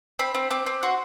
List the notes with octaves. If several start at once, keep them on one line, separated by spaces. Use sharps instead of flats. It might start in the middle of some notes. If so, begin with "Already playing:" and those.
C4 B5
C4
C4 D6
C4
F#4 C6